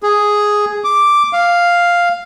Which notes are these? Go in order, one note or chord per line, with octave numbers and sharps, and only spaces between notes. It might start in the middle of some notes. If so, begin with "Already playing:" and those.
G#4
D6
F5